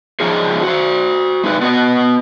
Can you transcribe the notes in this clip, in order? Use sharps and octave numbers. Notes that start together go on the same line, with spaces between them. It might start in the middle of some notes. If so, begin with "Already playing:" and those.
F3 C#4 D#4 F4 G#4
F#4 C5
G#3 D#4 B4
B3 F#4 B4 D#5